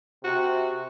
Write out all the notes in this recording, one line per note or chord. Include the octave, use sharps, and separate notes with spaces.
C3 F#4